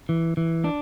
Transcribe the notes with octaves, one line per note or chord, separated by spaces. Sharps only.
E3
E3
D4